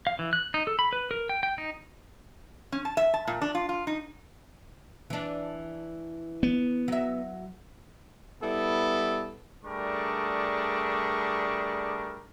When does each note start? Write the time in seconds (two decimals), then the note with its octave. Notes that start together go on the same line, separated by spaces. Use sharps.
0.07 F5
0.19 E3
0.33 F#6
0.54 D#4
0.67 A4
0.79 B5
0.93 B4
1.11 A#4
1.29 G5
1.43 G5
1.58 D#4
2.72 C#4
2.85 A5
2.97 E5
3.14 A5
3.27 A#2
3.41 D4
3.55 F4
3.69 F4
3.87 D#4
5.10 E3 D4
6.43 B3
6.88 F#3 E5
8.42 G3 B3 E4 A4
9.65 G3 A3 D4 G#4 A#4 C#6